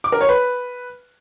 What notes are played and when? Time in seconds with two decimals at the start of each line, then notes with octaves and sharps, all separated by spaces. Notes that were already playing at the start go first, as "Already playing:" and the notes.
0.04 D6
0.12 A#4
0.21 C#5
0.29 B4